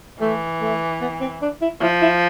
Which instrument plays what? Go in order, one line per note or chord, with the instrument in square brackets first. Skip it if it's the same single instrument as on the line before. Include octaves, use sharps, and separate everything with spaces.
[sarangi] E3 [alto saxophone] A3
[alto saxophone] A3
B3
C4
D4
E4
[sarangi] F3 [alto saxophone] E4
[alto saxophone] E4